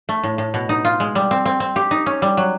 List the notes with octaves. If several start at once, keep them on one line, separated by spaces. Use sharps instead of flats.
A3
A2
A2
B2
D#4
F4
G#3
G3
C4
C4
C4
G4
D#4
C#4
G3
F#3